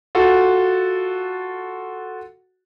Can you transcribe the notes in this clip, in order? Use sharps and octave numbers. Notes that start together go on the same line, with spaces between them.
F4 F#4 A4 F#5